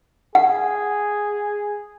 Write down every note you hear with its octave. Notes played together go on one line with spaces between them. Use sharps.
G#4 F#5